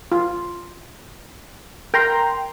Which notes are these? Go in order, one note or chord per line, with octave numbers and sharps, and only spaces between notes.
F4
A#4 G5 A#5 C6